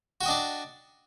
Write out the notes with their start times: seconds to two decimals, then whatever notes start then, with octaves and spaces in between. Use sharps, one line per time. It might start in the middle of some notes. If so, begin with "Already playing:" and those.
0.21 F#4
0.23 G5
0.26 D#5
0.28 D4
0.31 D5